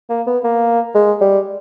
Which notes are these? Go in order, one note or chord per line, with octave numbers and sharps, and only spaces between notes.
A#3
B3
A#3
G#3
G3